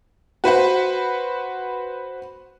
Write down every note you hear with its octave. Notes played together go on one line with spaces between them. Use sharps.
F#4 B4 C5 F#5